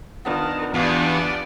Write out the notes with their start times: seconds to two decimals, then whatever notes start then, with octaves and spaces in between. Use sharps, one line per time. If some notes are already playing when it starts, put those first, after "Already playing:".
0.25 D#3 B3 D4 F4
0.74 E2 B3 D4 F4 G4 D5